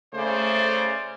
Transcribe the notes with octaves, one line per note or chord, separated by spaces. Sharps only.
C#3 A3 C5 D5